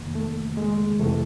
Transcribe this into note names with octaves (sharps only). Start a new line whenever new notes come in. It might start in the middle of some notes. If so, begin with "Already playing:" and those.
Already playing: F2 C3 D#3 A#3
A3
G#3
F2 C3 E3 A3